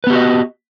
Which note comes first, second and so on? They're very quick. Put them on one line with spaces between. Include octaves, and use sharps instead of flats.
B4 B3 G4 F#4 D#5